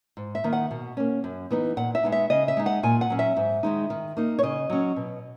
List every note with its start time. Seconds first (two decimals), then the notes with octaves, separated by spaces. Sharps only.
0.17 G#2
0.35 E5
0.44 D#3 A#3 D#4
0.53 F#5
0.71 B2
0.97 A#3 C#4
1.24 F#2
1.51 E3 B3 D#4
1.77 A#2 F#5
1.95 E5
2.03 G#3 B3 D#4
2.12 E5
2.30 C#3 D#5
2.48 E5
2.57 G#3 D#4
2.66 F#5
2.83 A#2 G#5
3.01 F#5
3.10 F#3 C#4
3.19 E5
3.37 G#2
3.63 D#3 G#3 D#4
3.90 D#3
4.17 A#3 D#4
4.39 C#5
4.43 C#3 D#5
4.70 F#3 C#4
4.96 B2